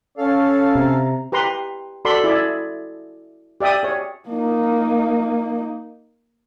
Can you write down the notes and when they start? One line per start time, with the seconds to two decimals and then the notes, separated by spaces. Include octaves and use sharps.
0.18 C#4 A4 C#5 F5
0.75 C3 A#5
1.32 G4 B4 A#5 C6
2.05 F#4 A4 D5 B5 C6
2.24 E4 G#4 D5 E5
3.60 G4 D5 E5 G5 D#6
3.83 G#4 C#5
4.29 A#3 D#4